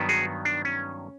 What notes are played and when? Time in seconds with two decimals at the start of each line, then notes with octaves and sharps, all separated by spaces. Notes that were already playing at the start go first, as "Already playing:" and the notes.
Already playing: G2 D#3 F#3 B3
0.09 F#4 G#4
0.45 D4
0.65 C#4